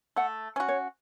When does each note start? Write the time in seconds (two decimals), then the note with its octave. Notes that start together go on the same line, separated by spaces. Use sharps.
0.16 A3 F#5
0.56 C#4 F#4
0.68 C#5